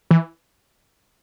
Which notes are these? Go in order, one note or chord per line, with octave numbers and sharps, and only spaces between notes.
E3